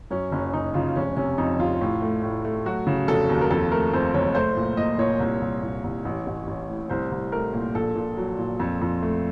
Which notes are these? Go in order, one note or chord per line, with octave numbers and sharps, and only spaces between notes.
F#2 C#4
F#1 C#4
F#1 D#4
C#3 F4
F1 C#4
C3 C#4
F2 D#4
F1 F4
A2
A3
A2
A3
F#3 F#4
C#3
F1 A4
D#2
A#4
F2 A4
A3 A#4
F2 C5
F#1 C#5
A3 C5
A#2
A#2 D#5
A#2 C#5
C2
C2
A#2
C2
A1
A1
A1
A2
C2 C5
C2
A3 A#4
A#2
A#1 A4
A#2
F#3
A#2
F2
F2
A3